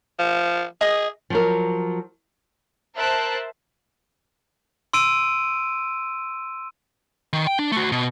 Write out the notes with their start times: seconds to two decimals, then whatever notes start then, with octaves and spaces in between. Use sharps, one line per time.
0.19 F3
0.81 G#4 D#5 D#6
1.30 F3 F#3 A#4
2.96 A#4 C5 E5 A5 F#6
4.93 C6 E6 D7 D#7
7.33 D#3
7.47 G5
7.59 D4
7.72 A3 F#4
7.92 B2